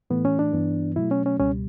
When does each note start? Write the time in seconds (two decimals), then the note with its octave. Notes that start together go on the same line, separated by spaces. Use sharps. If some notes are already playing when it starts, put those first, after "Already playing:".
0.10 A2 E3 A3 B3
0.25 C#4
0.39 D4
0.53 G2 E3 B3
0.96 B2 F#3 A3 E4
1.11 C#4
1.26 C#4
1.39 C#2 B2 G3 C#4